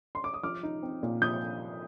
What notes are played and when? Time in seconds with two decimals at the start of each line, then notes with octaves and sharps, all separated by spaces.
0.15 C6
0.24 D6
0.34 D#6
0.43 F3 D6 F6
0.63 D#4
0.83 C4
1.03 A#2
1.21 F3 D#6 G6